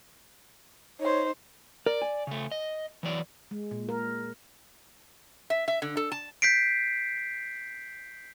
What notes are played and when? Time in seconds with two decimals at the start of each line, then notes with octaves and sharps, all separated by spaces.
1.00 D#4 C5 C#5
1.86 A#4 D5
2.02 G#5
2.27 C#3 A3
2.51 D#5
3.03 E3 F#3 D5
3.51 G#3
3.71 A#2
3.89 A#4
5.50 E5
5.68 E5
5.82 D3
5.97 A4
6.12 A5
6.42 G6 B6 C7 D7